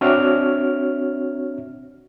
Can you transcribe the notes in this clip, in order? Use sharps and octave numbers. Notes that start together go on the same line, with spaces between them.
C4 D4 F#4 C#5 E5 F6